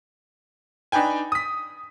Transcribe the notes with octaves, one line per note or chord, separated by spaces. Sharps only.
D4 D#4 B4 G5 G#5
D#6 B6